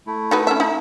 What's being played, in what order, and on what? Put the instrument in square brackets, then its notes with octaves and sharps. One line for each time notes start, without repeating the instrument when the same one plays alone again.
[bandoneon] A3 E4
[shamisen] D#4 F#4 B4
C#4 E5
D#4